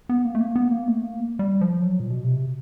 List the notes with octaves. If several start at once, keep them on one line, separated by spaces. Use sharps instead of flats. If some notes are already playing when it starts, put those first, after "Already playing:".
B3
A#3
A3
A#3
B3
A#3
A3
A#3
G3
F3
F#3
A#2
B2
C3